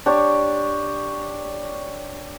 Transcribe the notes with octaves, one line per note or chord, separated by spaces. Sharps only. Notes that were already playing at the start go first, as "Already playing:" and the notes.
D4 G4 C#5